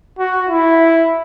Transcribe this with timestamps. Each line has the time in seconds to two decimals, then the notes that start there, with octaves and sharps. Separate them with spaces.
0.19 F#4
0.50 E4